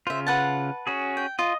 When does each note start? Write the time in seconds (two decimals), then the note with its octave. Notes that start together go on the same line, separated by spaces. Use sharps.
0.07 C#3 F4 C5 E5
0.27 B4 F#5 A5
0.87 C#4 F#4 G#4
1.17 G5
1.39 F4 D#5